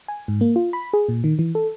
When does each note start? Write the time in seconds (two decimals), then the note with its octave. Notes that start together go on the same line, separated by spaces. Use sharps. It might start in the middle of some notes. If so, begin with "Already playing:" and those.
0.08 G#5
0.28 G#2
0.41 A#3
0.56 F4
0.73 B5
0.93 G#4
1.09 A#2
1.24 D#3
1.39 E3
1.55 A4